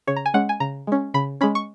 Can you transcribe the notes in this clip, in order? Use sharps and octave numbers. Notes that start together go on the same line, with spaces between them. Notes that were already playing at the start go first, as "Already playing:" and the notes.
C#3 C#5
A#5
G#5
G#3 C#4 F#5
G#5
C#3 A#5
G#3 C#4
C#3 B5
G#3 C#4 B5
C#6